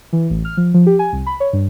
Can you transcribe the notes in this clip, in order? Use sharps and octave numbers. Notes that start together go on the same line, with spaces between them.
E3
A1
F6
F3
F3
G4
G#5
C2
B5
C#5
G2